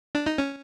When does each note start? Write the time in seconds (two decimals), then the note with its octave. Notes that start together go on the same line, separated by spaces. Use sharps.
0.15 D4
0.26 D#4
0.38 C#4